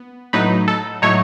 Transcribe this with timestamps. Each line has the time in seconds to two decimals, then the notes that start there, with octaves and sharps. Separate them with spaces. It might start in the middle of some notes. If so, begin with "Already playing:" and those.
Already playing: B3
0.33 A2 F#3 A3 D#4 B4
0.68 A4
1.02 A2 F#3 A3 D#4 C#5